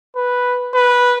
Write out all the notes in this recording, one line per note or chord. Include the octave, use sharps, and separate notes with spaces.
B4
B4